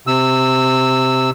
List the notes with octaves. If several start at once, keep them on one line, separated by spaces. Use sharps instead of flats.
C3 E6